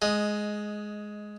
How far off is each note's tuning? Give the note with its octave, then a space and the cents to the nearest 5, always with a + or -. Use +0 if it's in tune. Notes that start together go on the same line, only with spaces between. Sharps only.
G#3 +10 D#5 +0